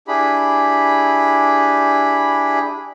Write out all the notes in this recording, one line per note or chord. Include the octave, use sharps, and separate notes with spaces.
D4 E4 G4 G#4 B5